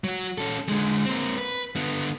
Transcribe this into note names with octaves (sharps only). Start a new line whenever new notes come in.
F#3 F#4
C#4 A4
D3 G#3
A#3 C4
B4
D3 B3